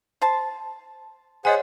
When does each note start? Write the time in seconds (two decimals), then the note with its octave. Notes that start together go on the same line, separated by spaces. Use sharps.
0.22 C5 A5
1.45 G#4 C5 C#5 D#5 F#5 G#5